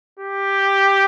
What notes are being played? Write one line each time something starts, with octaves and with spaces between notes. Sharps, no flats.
G4